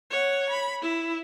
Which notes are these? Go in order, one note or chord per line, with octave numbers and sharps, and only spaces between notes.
C#5 F#5
B5
E4